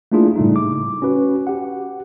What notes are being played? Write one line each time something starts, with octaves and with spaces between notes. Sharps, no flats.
A3 A#3 D4 E4 F4 G#4
A2 C#3 G3 A3 D#4
D6
C#4 F#4 B4
G4 F#5